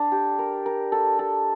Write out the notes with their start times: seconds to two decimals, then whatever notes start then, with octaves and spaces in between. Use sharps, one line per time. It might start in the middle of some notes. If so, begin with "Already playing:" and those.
Already playing: D4 A4 F5
0.12 G4
0.39 A#4
0.66 A#4
0.92 A4
1.19 A4